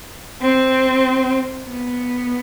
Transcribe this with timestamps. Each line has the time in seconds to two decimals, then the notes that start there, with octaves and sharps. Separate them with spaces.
0.40 C4
1.67 B3